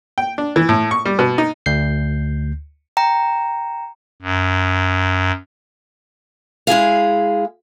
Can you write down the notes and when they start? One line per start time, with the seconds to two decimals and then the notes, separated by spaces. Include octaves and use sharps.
0.18 G5
0.38 D4
0.56 E3
0.69 A2
0.91 C#6
1.05 G3
1.19 B2
1.38 D#4
1.66 D2 G6 C7
2.97 G5 A#5
4.22 F#2
6.67 G#3 E4 G#4 F5